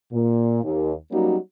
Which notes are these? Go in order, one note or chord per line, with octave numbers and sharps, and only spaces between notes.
A#2
D#2
F#3 G3 A#3 C#4 D#4 F#4